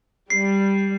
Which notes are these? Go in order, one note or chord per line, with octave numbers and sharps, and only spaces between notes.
G3 C7